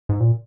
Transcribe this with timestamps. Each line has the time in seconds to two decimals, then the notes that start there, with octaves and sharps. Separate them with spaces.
0.09 G#2
0.20 A#2